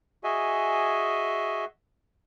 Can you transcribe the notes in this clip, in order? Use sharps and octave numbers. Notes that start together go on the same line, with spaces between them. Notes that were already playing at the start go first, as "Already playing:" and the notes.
F#4 G#4 D#5 E5 G#5